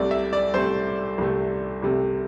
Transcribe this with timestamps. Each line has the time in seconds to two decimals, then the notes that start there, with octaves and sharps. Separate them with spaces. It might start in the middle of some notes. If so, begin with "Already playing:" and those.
Already playing: C2 C3 A3 D5
0.11 E5
0.33 D5
0.54 C2 C3 A3 C5
1.18 C2 C3 A3
1.83 C2 C3 A3